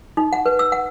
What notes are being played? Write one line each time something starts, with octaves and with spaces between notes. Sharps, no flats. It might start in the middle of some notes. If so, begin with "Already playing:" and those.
D#4
F#5
B4
E6
F#5